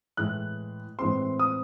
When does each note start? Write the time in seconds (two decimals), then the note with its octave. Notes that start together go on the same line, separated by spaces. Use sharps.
0.17 A2 E3 G#3 F#6
0.99 A2 E3 G#3 C4 C6
1.39 D#6